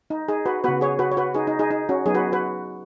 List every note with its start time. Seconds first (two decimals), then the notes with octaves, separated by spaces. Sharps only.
0.10 D#4
0.28 D#4 G#4
0.46 F#4 B4
0.64 C#3 B3 F#4 B4
0.81 G#4 C#5
0.99 F#4 B4
1.12 C#5
1.17 F#4 B4
1.34 D#4 G#4
1.47 D#4
1.59 D#4 G#4
1.71 D#4
1.89 C#4 F#4
2.06 F#3 B3 D#4 G#4
2.15 F#4 B4
2.32 F#4 B4